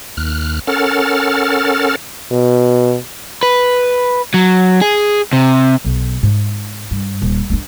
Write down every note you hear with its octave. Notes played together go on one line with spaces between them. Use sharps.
D#2 F6 F#6
C#4 A4 A#4 F#5 F6 A6
B2
B4
F#3
G#4
C3
B1
G#2
G2
D#1
G3 D4